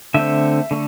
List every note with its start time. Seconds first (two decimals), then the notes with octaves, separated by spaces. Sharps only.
0.14 D3 A3 C4 E5
0.71 D3 A3